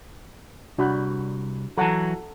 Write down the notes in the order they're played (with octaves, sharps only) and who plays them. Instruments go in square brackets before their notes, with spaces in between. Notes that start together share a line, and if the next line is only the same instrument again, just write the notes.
[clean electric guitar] C2 [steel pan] D4 F#4 B5
[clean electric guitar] E3 F#3 [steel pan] A4 F#5 A#5